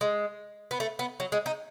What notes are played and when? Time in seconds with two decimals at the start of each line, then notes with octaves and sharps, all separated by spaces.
0.01 G#3
0.71 B3
0.80 A3
0.99 B3
1.20 F#3
1.32 G#3
1.46 D#4